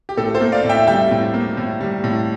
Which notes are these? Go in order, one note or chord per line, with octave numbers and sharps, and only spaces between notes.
G4
A2 A4
A4 C5
A#3
D5 F5
A2
E5 G5
G3 E5 G5
A2
A#3
A2
G3
A2